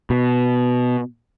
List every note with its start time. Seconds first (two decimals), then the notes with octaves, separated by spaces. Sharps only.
0.10 B2